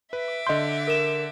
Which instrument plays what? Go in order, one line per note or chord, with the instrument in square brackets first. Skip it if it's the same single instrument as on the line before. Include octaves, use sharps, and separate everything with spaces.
[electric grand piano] B4 [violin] E5 D6
[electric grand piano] D3 G6 [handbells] D#5 C6
[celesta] A#4 E7